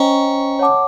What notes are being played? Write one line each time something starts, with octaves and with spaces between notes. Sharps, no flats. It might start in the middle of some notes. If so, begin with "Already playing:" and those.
Already playing: C#4 C5 D#5 G5 A#5 C#6
C#5 F#5 A5 D6